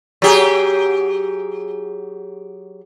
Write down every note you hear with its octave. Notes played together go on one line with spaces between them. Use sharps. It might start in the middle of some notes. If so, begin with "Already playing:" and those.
F#3 G4 G#4